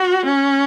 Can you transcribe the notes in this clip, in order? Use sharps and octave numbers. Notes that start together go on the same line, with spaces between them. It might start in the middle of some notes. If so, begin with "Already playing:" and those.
Already playing: F#4
C#4